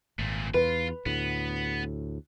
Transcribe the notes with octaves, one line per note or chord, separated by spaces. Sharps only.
G#1 A#2 A3
E2 F4 B4
D2 A2 B3